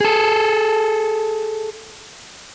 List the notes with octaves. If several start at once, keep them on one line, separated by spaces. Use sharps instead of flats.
G#4 A4